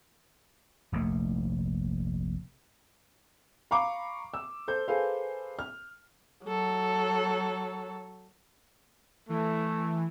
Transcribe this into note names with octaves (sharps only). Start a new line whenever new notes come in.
F1 A#1 C3 A3
F5 A#5 B5 C#6 D6
E6
A4 C5 G6
G#4 A4 B4 C5 F5
F6
F#3 A4
E3 A3